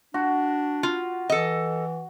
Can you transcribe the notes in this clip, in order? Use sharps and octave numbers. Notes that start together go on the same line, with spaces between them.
D4 F#4
F4
E3 A4 D#5